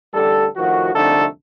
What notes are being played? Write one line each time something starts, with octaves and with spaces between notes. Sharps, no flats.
A1 D3 G3 A4
A2 D#3 F3 F#4
C2 F2 D3 A3 D#4 A4